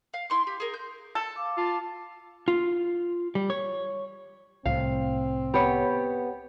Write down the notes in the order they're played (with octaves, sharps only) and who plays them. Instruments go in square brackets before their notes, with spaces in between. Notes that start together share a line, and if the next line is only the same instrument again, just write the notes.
[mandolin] F5
E4 C6 C#6
G4
G#4 A#4
G6
[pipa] A4
[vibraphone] F5 D6
[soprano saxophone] F4 [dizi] A5
[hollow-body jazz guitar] F4
G3
C#5
[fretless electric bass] C2 A2 C3 [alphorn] C4 [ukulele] F5
[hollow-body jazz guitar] B3 B5 [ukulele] G4 C#5